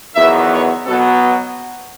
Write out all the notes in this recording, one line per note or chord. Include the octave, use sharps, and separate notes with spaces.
E2 D#3 F#3 B3 E5
C#5
B2 F#3 B3 A4